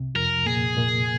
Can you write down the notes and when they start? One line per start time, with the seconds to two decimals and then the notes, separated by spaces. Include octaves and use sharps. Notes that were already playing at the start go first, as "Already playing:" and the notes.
Already playing: C2 C3
0.15 F2 F3 A#4
0.46 A#2 A#3 G#4
0.77 A#2 A#3